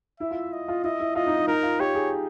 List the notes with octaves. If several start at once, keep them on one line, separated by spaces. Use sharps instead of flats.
E4 E5
F4
D#5
F4
E4 D#5
E4
F4 D#5
D#4
D#4
D#4 A#4
F4
G4 C#5
G#4